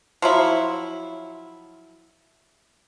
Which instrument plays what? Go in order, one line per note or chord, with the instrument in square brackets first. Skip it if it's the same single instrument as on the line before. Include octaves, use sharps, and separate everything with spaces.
[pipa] F3 F#3 E4